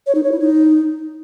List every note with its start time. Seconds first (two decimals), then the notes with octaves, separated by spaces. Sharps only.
0.07 C#5
0.15 D#4
0.23 C#5
0.32 E4
0.40 D#4